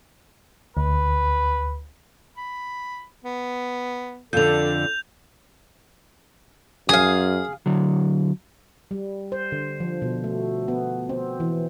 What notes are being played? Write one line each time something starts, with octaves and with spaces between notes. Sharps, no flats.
D2 B4
B5
B3
F2 D3 D4 A4 G6 F7
F#2 G#4 F5 D#6
D3 F#3
G3
C5
D3
F3
B2
A3
B3
C4
E3